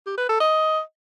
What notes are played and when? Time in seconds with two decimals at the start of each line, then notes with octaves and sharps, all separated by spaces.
0.06 G4
0.18 B4
0.29 A4
0.40 D#5